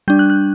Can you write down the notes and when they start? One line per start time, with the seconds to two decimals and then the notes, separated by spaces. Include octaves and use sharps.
0.08 G3 D4 G6
0.19 F#6
0.30 F#6